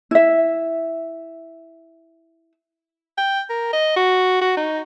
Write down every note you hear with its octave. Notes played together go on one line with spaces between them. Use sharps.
E4 E5
G5
A#4
D#5
F#4
F#4
D#4